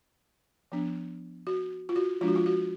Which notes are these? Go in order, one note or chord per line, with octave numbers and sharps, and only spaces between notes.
F3 B3 D4
F#4
F4
F#4
F3 G#3 D4 F4
F#4
F4
F#4